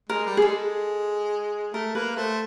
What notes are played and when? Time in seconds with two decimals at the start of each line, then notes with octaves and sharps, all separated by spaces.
0.09 G#3 A#4
0.26 G3
0.37 G#4
0.42 G#3 A4
1.73 A3 A#4
1.95 A#3 B4
2.17 A3 C5